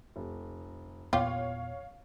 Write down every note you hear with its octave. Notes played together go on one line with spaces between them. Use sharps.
F1
E2 A#2 B3 F4 G4 C#5 F5